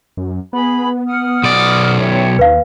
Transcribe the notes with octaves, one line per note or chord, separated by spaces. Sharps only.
F#2
B3 G#4 B5
F#5 D#6 F6
B1 D5
B2 C#5 E5 G5
D#2 B4 F5